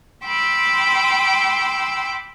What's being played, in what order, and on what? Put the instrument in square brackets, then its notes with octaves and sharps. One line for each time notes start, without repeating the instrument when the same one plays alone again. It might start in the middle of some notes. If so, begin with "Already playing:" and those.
[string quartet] G5 B5 C6 D6 E6